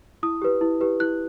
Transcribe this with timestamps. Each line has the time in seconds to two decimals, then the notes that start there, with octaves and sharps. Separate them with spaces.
0.23 E4 D#6
0.42 G4 B4
0.61 E4
0.81 G4 B4
1.00 E4 F#6